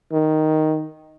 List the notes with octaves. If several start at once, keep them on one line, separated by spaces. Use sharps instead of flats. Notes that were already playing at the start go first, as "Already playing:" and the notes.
D#3